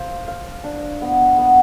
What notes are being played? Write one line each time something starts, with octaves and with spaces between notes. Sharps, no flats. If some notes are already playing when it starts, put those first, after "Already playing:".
Already playing: C5 F5
F5
D4
B3
B3